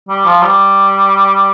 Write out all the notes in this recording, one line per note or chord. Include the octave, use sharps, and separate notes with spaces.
G3
F3
G3